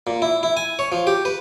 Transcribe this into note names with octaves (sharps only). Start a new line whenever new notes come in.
A#2
E4
E4
G#5
C#5
F3
G4
B4